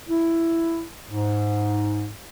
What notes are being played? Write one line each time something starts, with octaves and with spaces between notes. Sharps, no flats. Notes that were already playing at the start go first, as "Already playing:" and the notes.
E4
G#2